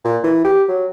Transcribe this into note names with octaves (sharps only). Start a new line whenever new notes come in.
A#2
E3
G4
F#3